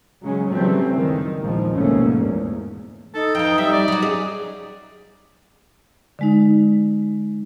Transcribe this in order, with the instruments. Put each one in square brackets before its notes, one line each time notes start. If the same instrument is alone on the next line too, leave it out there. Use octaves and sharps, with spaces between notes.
[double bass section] C#3 F#3 G#3 C#4
C#3 E3 F#3 G3 A3 C4
C#2 F#2 D#3
A#1 E2 G#2 E3 F3
G#1 D2 B2 A3 A#3 C#4
E2 G#2
[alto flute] D#4 [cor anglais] A4
[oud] F2 E3 [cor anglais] G5
[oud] G3 [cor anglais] E5
[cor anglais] D5
[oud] F#3 F#4
C#4 G#4
[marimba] D3 G#3 D#4